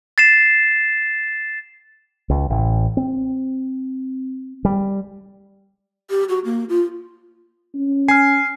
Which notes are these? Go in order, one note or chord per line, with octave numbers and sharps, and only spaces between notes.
A6 C7 E7
C#2
A1
C4
G3
G4
F#4
A#3
F4
C#4
G#5 F6 C7